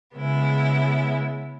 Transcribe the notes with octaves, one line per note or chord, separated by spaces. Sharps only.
C#3 G#3 B3 E4